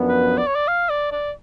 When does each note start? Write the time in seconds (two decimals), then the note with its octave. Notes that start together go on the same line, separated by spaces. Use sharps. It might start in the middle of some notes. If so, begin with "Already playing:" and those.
Already playing: F#2 F3 B3 D4
0.08 B4
0.38 D5
0.47 C#5
0.55 D5
0.67 F5
0.89 D5
1.11 D5